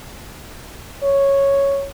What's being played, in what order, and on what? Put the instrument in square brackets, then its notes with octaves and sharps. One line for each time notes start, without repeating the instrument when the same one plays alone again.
[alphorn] C#5